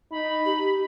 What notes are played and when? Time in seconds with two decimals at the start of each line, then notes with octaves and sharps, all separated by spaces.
0.11 D#4 B5
0.45 G4